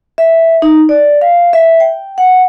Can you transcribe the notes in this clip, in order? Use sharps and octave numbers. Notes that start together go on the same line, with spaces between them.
E5
D#4
D5
F5
E5
G5
F#5